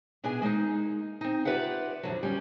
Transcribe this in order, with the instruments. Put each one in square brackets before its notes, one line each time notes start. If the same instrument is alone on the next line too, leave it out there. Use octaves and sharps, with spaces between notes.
[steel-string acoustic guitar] B2 B3 D4 E4 G#4 G#5
G#3 A#3 C#4 D#4
C4 D#4
F4 G4 B4 D5 E5 F#5
F2 A#2 D3 F#3
G3 C#4